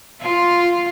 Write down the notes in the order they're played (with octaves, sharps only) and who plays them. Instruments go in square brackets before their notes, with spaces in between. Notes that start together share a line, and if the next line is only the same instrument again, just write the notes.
[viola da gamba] F4